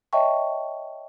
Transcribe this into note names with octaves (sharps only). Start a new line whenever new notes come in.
C#5 D#5 E5 G5 A5 C#6